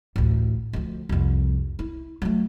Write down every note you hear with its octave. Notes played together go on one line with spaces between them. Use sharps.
A1 D2
D2 F3
C2 F2
E4
F#3 A3